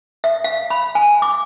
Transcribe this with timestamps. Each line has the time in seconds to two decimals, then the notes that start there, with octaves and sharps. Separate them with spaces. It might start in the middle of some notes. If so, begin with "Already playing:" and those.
0.24 E5
0.44 F5
0.70 B5
0.95 G#5
1.22 D6